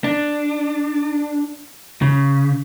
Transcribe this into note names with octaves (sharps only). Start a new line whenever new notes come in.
D4
C#3